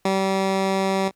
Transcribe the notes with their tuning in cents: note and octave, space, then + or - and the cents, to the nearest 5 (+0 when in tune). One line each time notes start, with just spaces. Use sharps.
G3 -30